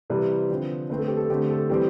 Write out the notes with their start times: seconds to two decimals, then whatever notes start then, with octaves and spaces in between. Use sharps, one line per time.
0.10 C3 E3 G3 C4 B4
0.49 D3 F3 C4
0.89 D3 A3 C4 B4
0.99 A4
1.07 G4
1.17 A4
1.30 D3 A3 C4 G4
1.50 A4
1.70 E3 G3 C4 G4